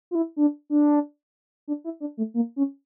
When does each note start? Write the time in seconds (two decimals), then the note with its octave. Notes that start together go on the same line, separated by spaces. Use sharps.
0.11 F4
0.15 E4
0.36 D4
0.70 D4
1.68 D4
1.84 E4
2.00 D4
2.17 A3
2.34 A#3
2.56 C#4